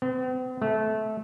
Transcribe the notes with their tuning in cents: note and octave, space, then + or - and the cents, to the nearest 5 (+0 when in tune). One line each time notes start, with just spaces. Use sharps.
C4 -45
A3 -20